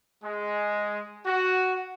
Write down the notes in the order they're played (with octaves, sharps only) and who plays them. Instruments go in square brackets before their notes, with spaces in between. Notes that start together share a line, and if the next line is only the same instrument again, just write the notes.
[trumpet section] G#3
F#4